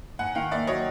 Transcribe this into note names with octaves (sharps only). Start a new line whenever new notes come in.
G#2 F#5 G#5
D#3 F5 G5
A#3 D5 E5
F#3 C#5 D#5